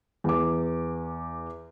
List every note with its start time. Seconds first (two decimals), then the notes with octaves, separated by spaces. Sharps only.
0.24 E2 D6